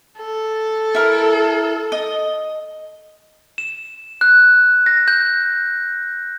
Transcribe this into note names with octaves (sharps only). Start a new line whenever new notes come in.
A4
E4 A#4
D#5
E7
F#6
A#6
G6